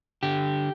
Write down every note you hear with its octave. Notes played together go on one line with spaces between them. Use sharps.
D3 G4